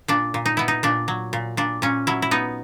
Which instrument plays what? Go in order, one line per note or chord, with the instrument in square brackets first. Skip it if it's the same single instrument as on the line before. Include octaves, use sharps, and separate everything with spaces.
[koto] A#2 D4
A#2
D#4
B3 E4
D#4
A#2 D4
F#3
A#2
A#2 D4
A#2 C#4
F#3 E4
E4
B3 D#4